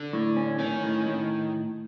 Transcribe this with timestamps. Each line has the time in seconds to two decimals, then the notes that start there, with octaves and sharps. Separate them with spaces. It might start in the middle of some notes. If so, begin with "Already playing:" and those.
Already playing: D3
0.13 A2
0.36 C#4
0.59 D#3 C#4
0.83 A2
1.06 A2